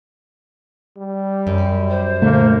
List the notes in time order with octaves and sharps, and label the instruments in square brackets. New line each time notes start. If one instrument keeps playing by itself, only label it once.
[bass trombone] G3
[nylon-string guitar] F#2
[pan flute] C5
[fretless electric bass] A#2 D3 A3 [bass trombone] A#3